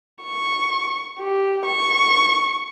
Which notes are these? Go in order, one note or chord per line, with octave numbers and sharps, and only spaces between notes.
C#6
G4
C#6